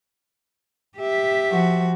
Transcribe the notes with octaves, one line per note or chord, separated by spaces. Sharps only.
G4 E5
F3 F#4